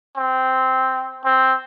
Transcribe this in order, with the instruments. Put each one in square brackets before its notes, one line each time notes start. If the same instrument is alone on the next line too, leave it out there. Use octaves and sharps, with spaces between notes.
[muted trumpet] C4
C4